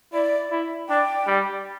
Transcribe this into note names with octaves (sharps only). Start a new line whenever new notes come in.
E4 D5
E4
D4 G5
G3